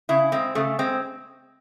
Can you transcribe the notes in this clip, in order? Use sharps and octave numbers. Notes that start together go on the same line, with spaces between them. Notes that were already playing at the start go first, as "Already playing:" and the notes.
C#3 E4
G#3 C4
C#3 A3
G#3 C4